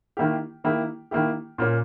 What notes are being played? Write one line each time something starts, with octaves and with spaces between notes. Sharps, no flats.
D#3 A#3 E4 G4
D#3 A#3 E4 G4
D#3 A#3 E4 G4
A#2 A#3 C#4